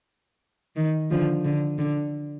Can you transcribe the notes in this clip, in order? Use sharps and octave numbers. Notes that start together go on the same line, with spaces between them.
D#3
D3 F3
D3
D3